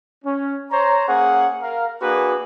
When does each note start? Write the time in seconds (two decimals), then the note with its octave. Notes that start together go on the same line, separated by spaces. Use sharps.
0.24 C#4
0.71 C5 C#5 A#5
1.07 A#3 C#4 G#4 F#5
1.61 A#4 F5
2.01 A#3 D4 F#4 G#4 B4